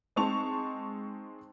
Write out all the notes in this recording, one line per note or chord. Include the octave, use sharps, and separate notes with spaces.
G#3 C4 D#4 A5 C#6 F7